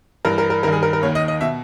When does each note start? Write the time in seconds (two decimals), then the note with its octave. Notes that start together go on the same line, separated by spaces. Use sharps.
0.25 G2 E3 A#4
0.38 A#4
0.50 A#4
0.63 G2 D#3 A#4
0.73 G#4
0.83 A#4
0.93 A#4
1.02 D#2 D#3 C#5
1.15 D#5
1.28 D#5
1.41 B2 E5